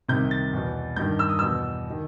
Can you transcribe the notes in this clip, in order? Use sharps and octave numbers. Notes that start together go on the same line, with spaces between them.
C2 C3 D#3 G6
A6
E2 B2
G2 D#3 G6
E6
D#6
E2 B2 E6
D#3